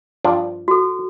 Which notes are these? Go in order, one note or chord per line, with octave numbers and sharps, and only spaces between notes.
G2 F3 D4
F#4 A4